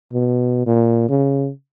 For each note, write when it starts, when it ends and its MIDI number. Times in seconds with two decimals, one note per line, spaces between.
0.13 0.66 47
0.66 1.07 46
1.09 1.50 49